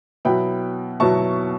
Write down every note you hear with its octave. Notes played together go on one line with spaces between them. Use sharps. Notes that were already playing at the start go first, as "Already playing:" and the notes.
B2 F#3 B3 E4 G5 B5
B2 F#3 B3 E4 A5 C#6